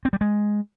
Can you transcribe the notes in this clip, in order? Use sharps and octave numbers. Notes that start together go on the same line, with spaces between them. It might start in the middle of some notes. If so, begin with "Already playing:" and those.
C4
G3
G#3